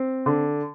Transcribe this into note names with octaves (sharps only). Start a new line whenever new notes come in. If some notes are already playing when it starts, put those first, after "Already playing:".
Already playing: C4
D3